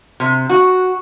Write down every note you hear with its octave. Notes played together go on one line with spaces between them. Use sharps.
C3
F#4